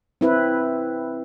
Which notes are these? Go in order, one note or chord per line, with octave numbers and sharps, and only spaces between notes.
C4 E4 B4